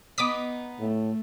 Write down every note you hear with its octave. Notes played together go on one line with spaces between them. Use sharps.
B3 D#4 D6 D#6 B6
A2 A3